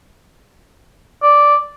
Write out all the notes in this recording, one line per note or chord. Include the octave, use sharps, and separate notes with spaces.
D5